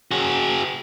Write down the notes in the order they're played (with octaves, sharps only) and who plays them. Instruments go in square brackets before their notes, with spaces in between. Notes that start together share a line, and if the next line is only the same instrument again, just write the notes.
[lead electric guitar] F#4 G#4